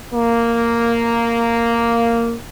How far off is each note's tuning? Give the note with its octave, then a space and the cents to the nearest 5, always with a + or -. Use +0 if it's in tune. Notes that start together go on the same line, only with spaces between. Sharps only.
A#3 -5